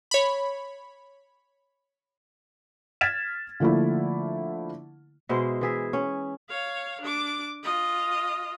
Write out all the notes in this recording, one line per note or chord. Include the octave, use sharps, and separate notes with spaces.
C#5 B5
F6 G#6 A6 B6 E7
D3 F3 A3 A#3 E4
B2 G#3 E4 C5
E3 G#4 E5
C#4
C#5 F5
D4 D6
F4 D#5